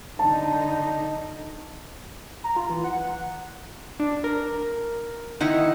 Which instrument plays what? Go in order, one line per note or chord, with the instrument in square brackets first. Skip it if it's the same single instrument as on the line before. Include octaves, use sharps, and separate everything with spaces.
[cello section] D3 D#4 [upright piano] A5
[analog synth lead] A#5
F4
E3
F#5
[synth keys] D4
A#4
[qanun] D#3 D#4 E4 [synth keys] F#5